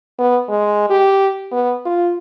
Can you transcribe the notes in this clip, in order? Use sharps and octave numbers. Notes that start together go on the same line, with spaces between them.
B3
G#3
G4
B3
F4